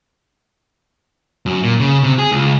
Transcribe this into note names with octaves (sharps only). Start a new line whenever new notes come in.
F#2
A#2
C#3
C3
G#4
C#2